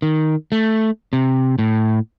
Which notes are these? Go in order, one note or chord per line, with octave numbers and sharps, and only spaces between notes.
D#3
A3
C3
A2